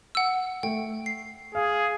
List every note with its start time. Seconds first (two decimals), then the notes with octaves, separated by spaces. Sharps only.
0.15 F#5 E6
0.63 A3 G5
1.06 C7
1.55 G#4 F5